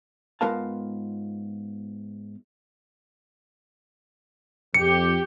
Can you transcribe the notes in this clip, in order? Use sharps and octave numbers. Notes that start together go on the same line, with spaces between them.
G#2 B3 F4 A#4 F5 A5
F2 G4 C#7